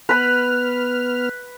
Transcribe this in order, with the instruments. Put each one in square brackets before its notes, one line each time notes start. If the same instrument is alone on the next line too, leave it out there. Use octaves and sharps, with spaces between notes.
[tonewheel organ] B3 F6 [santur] B4 B5